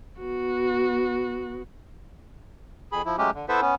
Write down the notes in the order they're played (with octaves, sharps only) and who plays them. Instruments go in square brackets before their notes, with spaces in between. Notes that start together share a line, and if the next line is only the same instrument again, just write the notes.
[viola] B3 F#4
[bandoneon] F2 G#4 B5
F3 E4
F#3 G#3 A3 C#4 G4
D3
B3 E4 A4 B4 C5 E5
B3 C#4